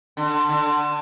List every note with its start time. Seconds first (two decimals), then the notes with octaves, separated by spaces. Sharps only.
0.17 D3
0.49 D3